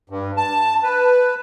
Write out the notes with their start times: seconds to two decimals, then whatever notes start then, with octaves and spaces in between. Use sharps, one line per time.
0.10 G2
0.37 A5
0.83 B4